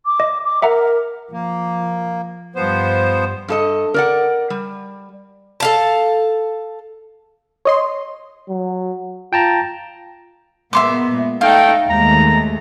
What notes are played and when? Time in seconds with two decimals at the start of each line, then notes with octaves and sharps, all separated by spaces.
0.05 D6
0.20 D#5
0.44 D6
0.62 A#4 E5 F#5 A#5
1.32 F3 A#3
2.56 G2 F3 G3 B3 C5
3.48 G2 A4 D#5
3.94 A#4 D5 F#5
4.50 G3
5.60 A4 F5 A5
7.65 C#5 D#5 C6
8.49 F#3
9.33 F4 G5 A5 A#5
10.73 A#2 G#3 B3 E5 C6 D6
11.41 A3 D#4 F5 G5
11.88 D#2 G#3 A3 A#5